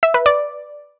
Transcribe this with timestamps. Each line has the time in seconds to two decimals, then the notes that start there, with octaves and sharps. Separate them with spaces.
0.03 E5
0.14 B4
0.26 D5